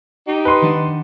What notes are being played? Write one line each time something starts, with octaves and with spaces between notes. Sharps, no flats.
D#4 G4
B4 C6
D#3 D4 F#5